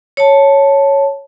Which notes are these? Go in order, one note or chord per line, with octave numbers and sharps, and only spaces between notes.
C#5 A5